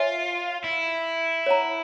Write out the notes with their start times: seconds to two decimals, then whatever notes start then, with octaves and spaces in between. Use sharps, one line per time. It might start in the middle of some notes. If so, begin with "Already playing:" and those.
Already playing: F4 C#5 E5 G#5
0.64 E4
1.46 C#5 F#5 A#5